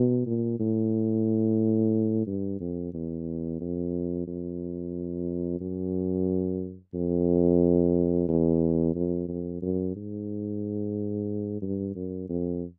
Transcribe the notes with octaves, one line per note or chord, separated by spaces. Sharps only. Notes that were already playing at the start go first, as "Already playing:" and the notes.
Already playing: B2
A#2
A2
G2
F2
E2
F2
F2
F#2
F2
E2
F2
F2
F#2
G#2
G2
F#2
F2